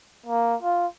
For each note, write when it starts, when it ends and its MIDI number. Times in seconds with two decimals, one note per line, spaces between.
0.26 0.55 58
0.62 0.86 65